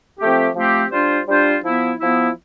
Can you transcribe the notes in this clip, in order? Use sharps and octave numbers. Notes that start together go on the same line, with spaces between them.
F3 A3 C4 G4
F3 A3 C4 G4
G3 D4 F4 C5
G3 D4 F4 C5
F3 B3 E4
F3 B3 E4